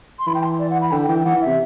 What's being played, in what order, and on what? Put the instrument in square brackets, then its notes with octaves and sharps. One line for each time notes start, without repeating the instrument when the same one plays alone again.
[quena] C6
[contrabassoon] E3 [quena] B5
[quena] G5
C6
D5
F#5
B5
[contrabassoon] D3 [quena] G5
[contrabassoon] E3 [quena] G5
[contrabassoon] E3 [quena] F#5
[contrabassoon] E3
[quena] E5
[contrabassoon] C3